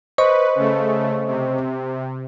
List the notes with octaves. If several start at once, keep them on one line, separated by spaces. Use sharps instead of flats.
B4 C5 D#5 C#6
C#3 A3
C3